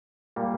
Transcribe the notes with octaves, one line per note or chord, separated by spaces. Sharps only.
A#2 G3 A#3